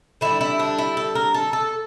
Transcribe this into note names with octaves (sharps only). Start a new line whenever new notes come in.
D3 G3 E4
E4
D4
E4
A4
A#4
A4
A4